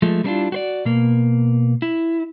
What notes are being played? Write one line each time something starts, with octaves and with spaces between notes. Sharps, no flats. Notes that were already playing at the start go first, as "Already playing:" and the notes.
F3 G#3 A3
G3 A#3 C#4 D4 E4 F4
F#4 C5 D5
B2 A#3
E4